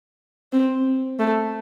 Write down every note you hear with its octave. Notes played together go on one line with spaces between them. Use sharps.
C4
A3